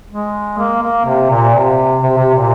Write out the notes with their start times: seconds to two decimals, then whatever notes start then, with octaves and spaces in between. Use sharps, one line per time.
0.11 G#3
0.58 A#3
0.83 A#3
1.05 C3
1.30 A#2
1.54 C3
2.02 C3
2.18 C3
2.34 A#2